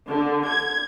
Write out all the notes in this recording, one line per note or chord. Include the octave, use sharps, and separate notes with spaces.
D3
G#6